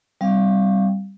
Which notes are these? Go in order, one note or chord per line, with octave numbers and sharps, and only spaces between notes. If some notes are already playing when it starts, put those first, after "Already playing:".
G3 C4 F5